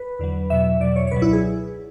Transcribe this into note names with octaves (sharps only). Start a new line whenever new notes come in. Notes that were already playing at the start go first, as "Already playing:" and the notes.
Already playing: B4
E2 D3 F#3
E2 B2 F#3 E5
E2 B2 F#3 D5
C#5
C#5
C#2 B2 F#3 B4
E4
G#4